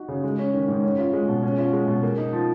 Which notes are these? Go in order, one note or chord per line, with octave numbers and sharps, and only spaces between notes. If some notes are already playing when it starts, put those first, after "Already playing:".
Already playing: D#4 F#4
C#3
G#3
C#4
D#3
G#2
C#4
F4
G#3
B2
C#4
F4
G#3
B2
A#3
D#4
F3